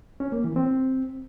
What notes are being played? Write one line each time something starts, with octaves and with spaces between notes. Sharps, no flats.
C#4
A#3
E3
C4